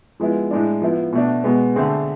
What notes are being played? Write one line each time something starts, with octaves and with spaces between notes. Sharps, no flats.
F3 G#3 B3 E4
A2 G#3 D4
F3 B3 E4
B2 A3 D4
B2 G#3 B3
D3 A3 C4 G#4